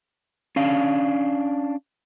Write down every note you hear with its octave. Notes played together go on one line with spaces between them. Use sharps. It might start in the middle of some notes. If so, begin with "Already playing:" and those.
C#4 D4 F5